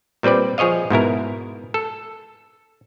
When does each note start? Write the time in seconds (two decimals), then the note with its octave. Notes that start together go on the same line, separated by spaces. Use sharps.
0.23 A#2 G3 C4 B4 D5
0.58 F3 G#4 C#5 D#5 F5
0.90 G#2 B2 E4 A#4
1.74 A4